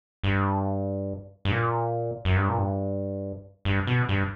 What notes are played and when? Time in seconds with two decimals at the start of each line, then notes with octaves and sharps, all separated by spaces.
0.24 G2
1.45 G2
1.51 A#2
2.25 F#2
2.36 G2
2.49 A#2
2.58 G2
3.65 G2
3.87 B2
4.09 G2